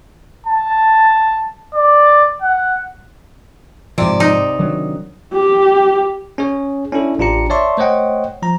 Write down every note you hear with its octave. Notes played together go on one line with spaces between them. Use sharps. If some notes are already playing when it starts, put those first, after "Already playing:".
A5
D5
F#5
G#2 C3 F3 D5
D#4
D#3 F#3 D4
G4
C#4 G#4 C#5
C#4 D4 E4 A4
A1 D4 F4 G4 A#5 C#7
C#5 D5 E5 A5 C6 C#6
A3 C5 C#5 D#5 F#5 G5
F3 A#5